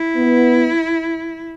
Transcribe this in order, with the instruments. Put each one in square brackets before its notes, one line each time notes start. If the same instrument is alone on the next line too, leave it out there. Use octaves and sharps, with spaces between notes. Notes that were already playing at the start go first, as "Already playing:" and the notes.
Already playing: [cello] E4
[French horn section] B3